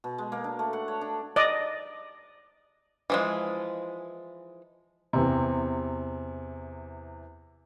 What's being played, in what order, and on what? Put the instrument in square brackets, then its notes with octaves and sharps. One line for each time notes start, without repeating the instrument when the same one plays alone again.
[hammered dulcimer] B2
G#3
A#3
D4
A3
F#5
C#5
D4
[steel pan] D5 D#5
[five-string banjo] E3 F3 G#3
[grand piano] E2 C3